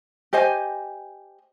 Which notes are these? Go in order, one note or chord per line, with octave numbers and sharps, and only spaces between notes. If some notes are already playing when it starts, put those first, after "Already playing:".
G4 C5 D#5 G#5